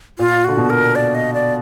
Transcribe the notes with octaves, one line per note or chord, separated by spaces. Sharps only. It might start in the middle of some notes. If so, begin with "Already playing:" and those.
A#2 F4
D3 F#4
B2
A#4
D5
D#5
D5